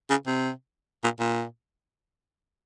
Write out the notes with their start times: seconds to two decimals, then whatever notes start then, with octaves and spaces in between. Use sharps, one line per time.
0.10 C#3
0.26 C3
1.04 A#2
1.20 A#2